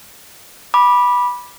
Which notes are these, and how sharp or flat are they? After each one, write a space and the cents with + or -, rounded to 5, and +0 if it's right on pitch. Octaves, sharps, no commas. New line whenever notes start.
B5 -15 D6 +10